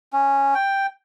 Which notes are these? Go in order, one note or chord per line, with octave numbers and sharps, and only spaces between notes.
C#4
G5